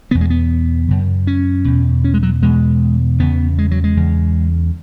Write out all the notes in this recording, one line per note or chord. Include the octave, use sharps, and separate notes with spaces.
E2 B2 B3
G#3
B3
F#2 C#3
C#4
E2 B2
C#4
G#3
F#3
E2 B2 G#3
E2 C#3 B3
G#3
F#3
G#3
E2 C#3